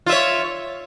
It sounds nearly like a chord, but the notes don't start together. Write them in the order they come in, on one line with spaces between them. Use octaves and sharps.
F4 E5 C#5